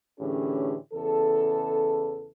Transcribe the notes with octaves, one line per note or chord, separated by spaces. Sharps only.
A2 D3 E3 C#4 G4 G#4
E2 C#3 E3 A4